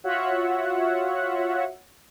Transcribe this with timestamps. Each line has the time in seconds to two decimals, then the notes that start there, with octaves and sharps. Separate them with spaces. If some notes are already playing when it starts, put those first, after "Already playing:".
0.04 F4 F#4 C#5 E5 F#5